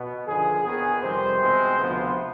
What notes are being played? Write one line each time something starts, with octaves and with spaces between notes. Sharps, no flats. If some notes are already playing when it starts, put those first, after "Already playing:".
Already playing: B2 B3
D#2 D3 F3 G#4
D#2 D#3 B3 G#4
F2 C3 D#3 G3 C4 C5
B2 G#3 C4
D2 C3 F3 B3